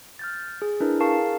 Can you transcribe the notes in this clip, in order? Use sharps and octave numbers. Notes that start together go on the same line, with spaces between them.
F6 G6 A6
G#4
D4 E4 A#4 B4
G#4 A#4 F5 A5 C#6 C7